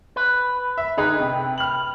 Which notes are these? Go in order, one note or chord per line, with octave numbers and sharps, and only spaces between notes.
B4
E5
D3 D#4 G#4 B4
C3
F6 F#7